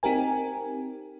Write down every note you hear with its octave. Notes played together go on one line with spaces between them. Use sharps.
C4 D#4 G4 A#4 G#5